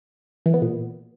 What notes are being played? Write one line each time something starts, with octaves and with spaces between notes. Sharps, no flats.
E3
B3
A#2